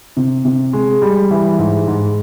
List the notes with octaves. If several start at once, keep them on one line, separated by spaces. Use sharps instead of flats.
C3
C3
G#3
G3
E3
G#2
G#2